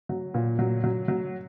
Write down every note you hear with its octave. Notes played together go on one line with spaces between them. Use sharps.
F#3
A#2
F#3
F#3
F#3